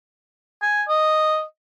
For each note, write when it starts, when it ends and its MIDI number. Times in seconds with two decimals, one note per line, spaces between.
0.62 0.83 80
0.89 1.42 75